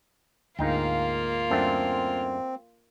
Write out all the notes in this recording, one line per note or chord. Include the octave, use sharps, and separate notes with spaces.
D2 G#2 A#3 D#4 F4 G5
F#2 A3 C4 D4